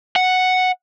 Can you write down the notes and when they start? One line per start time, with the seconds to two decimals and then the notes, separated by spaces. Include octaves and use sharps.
0.16 F#5